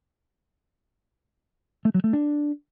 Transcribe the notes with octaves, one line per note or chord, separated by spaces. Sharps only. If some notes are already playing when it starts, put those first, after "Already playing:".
A3
F#3
A3
D4